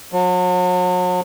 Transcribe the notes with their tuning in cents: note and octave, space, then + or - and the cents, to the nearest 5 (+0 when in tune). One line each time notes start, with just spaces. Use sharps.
F#3 -40